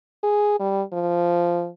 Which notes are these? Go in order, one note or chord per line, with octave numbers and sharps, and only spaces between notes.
G#4
G3
F3